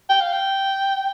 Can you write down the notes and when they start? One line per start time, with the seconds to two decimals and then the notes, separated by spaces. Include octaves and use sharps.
0.10 G5
0.21 F5
0.33 G5